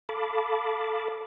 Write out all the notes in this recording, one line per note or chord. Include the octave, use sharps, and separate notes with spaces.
A4 F5 A5 B5 D6